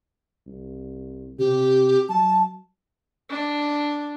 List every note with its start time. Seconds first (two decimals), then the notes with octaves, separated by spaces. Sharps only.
0.47 C2
1.39 C3 G4
2.09 F#3 A5
3.30 D4